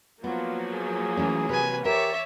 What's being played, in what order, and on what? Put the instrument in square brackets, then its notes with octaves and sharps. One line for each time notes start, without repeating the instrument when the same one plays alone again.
[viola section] F3 F#3 A#3 [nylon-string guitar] B3 [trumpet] F4
[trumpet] G#4
[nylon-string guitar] E3 A3 C#4
[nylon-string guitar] C3 [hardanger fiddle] B4 G#5
[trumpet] G4 [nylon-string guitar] A#4 [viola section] C#5 D5 [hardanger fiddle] E5